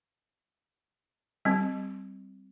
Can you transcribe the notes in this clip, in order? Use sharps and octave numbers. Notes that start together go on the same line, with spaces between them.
G3 C4